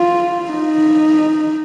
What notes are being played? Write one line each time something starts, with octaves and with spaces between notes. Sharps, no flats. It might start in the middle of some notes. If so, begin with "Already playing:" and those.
Already playing: F4
D#4